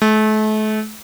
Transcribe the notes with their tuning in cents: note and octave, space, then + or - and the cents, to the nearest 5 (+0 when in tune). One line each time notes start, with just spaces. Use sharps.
A3 -35